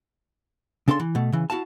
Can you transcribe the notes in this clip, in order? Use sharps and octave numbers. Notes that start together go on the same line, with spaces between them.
C#3 D4 A4 F#5 C6
E3
B2 A3
C#3 E3
E4 F#4 F5 A5